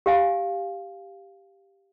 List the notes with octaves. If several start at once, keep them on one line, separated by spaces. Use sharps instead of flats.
G4 F5 G#5